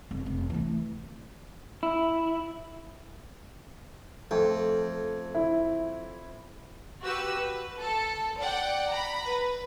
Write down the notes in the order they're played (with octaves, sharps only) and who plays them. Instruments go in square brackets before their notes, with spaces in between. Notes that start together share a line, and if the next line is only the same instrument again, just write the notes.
[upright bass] F1
F1
E3 A3
[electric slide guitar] E4
[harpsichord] F2 [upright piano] A3
[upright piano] E4
[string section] F#4 G4 B4 E6
B4
A4
D5 F#5 G5
A#5 B5
B4